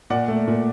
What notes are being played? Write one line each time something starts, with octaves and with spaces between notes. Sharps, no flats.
A#2 D5 F#5
A3
A#2